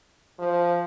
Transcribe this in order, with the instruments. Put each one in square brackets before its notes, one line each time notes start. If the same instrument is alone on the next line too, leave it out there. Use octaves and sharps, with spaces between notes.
[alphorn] F3